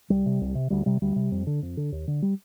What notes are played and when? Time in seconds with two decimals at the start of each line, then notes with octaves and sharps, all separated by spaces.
0.10 C2 G3
0.26 C3
0.41 C2
0.55 C3
0.70 D2 G3
0.86 C3 G3
1.02 D2 G3
1.16 C3
1.32 F2
1.47 D3
1.62 F2
1.77 D3
1.92 D#2
2.07 D3
2.22 G3